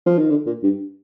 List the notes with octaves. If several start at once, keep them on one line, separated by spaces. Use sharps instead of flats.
F3
D#3
D3
A#2
G2